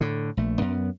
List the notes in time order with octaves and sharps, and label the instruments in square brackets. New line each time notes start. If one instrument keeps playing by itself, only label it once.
[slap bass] A2 D3
A#1 A3
F#2 B3